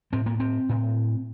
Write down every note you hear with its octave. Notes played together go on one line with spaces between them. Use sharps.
A2 C4
A#3
C4
A2